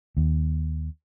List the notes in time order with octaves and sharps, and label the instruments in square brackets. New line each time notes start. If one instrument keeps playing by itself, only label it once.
[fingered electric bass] D#2